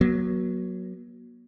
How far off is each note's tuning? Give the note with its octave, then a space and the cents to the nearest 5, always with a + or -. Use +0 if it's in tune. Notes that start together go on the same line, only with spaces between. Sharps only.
F#3 +0 A#3 +45